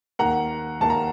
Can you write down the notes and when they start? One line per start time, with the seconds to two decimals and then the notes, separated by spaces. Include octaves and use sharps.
0.19 D#2 D#3 A#3 F#5 A#5
0.81 D#2 D#3 A#3 A5
0.90 A#5